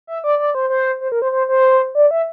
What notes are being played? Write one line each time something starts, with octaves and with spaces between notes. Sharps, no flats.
E5
D5
D5
C5
C5
C5
A#4
C5
C5
C5
D5
E5